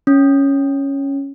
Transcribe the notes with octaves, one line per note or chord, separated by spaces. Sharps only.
C#4